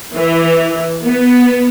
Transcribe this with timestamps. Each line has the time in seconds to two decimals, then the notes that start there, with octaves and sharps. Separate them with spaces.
0.15 E3
1.04 B3